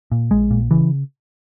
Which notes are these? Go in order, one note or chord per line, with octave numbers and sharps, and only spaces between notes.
A#2
A#1 G#3
A#2
C#3 E3